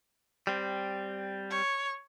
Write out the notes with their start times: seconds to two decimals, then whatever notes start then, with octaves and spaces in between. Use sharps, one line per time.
0.47 G3 C4
1.50 C#5